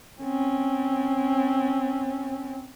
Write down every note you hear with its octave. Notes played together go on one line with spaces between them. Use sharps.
C4 C#4